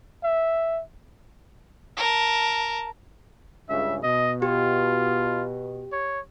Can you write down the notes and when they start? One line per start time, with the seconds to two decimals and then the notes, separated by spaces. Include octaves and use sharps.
0.24 E5
1.97 A#4 A5
3.69 C#2 G2 C#3 E5
4.03 B2 D#5
4.42 F4 G4
5.92 C#5